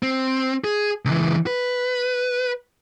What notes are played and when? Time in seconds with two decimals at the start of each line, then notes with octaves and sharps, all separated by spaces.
0.03 C4
0.64 G#4
1.05 C#2 E3
1.47 B4